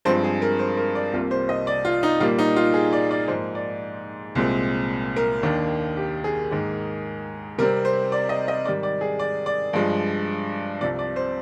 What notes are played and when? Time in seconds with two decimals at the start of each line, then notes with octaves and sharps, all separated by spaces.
0.05 G2 F3 G#3 C4 C5
0.24 G#4
0.42 A#4
0.59 C5
0.77 A#4
0.95 D5
1.13 C2 C3 G3 A#3 F4
1.31 C5
1.49 D#5
1.67 D5
1.85 F4
2.03 D#4
2.20 A#2 G3 A#3 F4
2.39 D#4
2.56 F4
2.74 G#4
2.93 D5
3.11 D5
3.28 G#2 F3 A#3 C5
3.55 D5
4.35 C2 A#2 G#3 C4
5.16 A#4
5.43 D#2 D#3 A#3 D4
5.97 G4
6.24 G#4
6.51 G#2 D#3 A#3
7.58 C3 G3 C4 A#4
7.85 C5
8.12 D5
8.29 D#5
8.48 D#5
8.65 G#2 D#3 G3 D5
8.83 D5
9.01 G#4
9.19 D5
9.46 D5
9.73 G2 F3 G#3
10.81 C2 C3 F3 D5
10.99 D5
11.16 C5